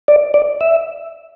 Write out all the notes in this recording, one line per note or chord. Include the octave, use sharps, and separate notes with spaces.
D5
D5
E5